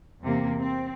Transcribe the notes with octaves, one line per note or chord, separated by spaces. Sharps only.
E2 C3 A#3
C4